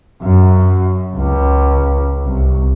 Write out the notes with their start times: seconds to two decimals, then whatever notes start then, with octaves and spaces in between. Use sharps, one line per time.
0.22 F#2
1.16 C#2
2.26 C2